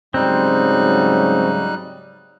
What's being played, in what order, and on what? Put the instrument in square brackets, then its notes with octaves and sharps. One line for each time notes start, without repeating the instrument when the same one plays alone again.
[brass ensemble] G#2 C#3 F#3 [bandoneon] G3 D#4 F#6 [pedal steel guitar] C4